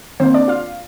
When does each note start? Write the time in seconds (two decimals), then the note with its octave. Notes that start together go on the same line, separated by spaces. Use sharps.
0.20 D#3 A#3 C4 C5
0.34 D4 D5
0.48 F4 F5